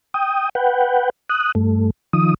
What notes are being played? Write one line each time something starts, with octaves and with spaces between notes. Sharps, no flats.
G5 D#6
B4 F#5 G5
D#6 F#6
G2 A3
D#3 F3 D#6